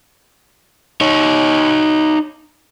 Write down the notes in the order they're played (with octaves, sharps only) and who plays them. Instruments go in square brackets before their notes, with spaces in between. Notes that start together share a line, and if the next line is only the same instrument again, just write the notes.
[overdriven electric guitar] D#4 C#5